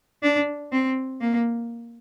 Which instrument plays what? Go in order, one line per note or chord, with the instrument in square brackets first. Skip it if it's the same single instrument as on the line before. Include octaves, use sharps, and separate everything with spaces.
[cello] D4
C4
A#3